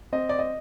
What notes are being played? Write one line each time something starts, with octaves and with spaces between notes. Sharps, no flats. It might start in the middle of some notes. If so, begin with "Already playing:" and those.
C4 D#5
D5
D#5